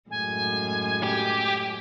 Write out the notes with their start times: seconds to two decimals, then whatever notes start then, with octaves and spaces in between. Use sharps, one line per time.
0.10 F#2 A2 G#3 G#5
1.03 G4